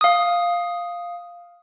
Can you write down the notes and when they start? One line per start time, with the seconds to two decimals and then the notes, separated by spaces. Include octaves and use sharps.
0.01 F5 D#6